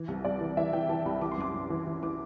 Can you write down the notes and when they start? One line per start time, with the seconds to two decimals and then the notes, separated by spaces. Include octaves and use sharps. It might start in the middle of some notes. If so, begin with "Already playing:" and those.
Already playing: E3
0.08 C2
0.24 C2 D5
0.41 E3
0.57 E3 E5
0.73 E3 G5
0.89 E3 A5
1.05 C2 B5
1.21 E3 D6
1.32 C6
1.38 F#2 D6
1.54 F#2
1.70 E3
1.87 E3
2.03 E3 D6